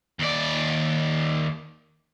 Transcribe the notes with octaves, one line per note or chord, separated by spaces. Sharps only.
D#2 D5